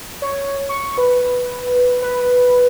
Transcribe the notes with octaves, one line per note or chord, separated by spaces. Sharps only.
C#5
C#6
B4
B4